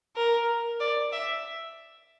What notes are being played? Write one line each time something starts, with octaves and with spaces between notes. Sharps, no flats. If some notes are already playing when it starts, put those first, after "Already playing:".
A#4
D5
E5